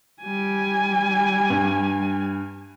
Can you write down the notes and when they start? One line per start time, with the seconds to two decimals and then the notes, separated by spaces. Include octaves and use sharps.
0.22 G3 G#5
1.50 G2